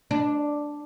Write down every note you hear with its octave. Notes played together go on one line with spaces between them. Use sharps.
D4